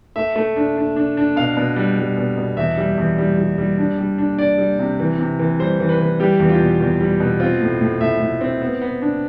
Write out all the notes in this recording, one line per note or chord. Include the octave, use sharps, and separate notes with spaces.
A3 E5
A3
D4
D4
D4
D4
B2 F5
B2
G3
G3
B2
B2
E2 E5
G3
E2
G3
G3
G3
D4
G3
D4
D4 D5
G3
C3
E3
C3
E3
G3 C5
E3
B4
E3
G3 G4
E2
F4
B2
E2
G3
B2
C4 F4
A2
A2
A2 E5
A2
C4
B3
B3
D4